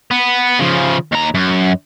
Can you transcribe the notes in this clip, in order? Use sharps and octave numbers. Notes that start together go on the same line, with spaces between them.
B3
C#3 F3
D#2 A#5
F#2